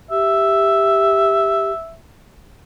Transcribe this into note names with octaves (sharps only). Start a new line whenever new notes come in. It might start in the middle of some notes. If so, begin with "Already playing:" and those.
G4 E5